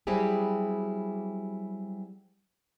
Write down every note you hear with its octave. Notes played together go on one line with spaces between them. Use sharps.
F#3 G3 C4 E4 G4 G#4